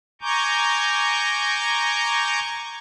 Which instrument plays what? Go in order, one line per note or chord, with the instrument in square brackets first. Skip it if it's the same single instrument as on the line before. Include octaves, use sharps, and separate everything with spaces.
[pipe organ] G#5 A#5 C#6 D6 G6